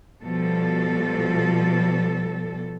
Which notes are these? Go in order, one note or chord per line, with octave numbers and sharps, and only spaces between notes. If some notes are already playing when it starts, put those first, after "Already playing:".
B2 F3 G3 A4